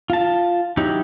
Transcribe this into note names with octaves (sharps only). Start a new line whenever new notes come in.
F4 A5
F#3 D#4 E4 G4